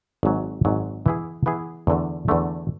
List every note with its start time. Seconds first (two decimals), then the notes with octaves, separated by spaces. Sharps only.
0.23 G#1 G#2 F#3
0.65 G#1 G#2 F#3
1.06 E3 B3 E4 G#4
1.46 E3 B3 E4 G#4
1.87 E2 D3 A3
2.28 E2 D3 A3